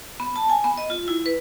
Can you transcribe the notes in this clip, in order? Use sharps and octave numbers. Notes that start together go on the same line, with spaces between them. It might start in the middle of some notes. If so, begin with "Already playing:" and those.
B3
A5
G#5
B3
D#5
F4
E4
B4